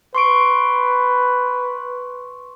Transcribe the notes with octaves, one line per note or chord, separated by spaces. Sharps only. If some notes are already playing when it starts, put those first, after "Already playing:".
B4 C6 C#6 D7